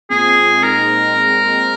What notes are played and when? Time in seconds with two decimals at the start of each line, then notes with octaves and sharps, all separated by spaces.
0.10 A#2 G#3 C4 F4 G#4
0.63 A#2 G#3 C4 D#4 A#4
1.15 A#2 G#3 C4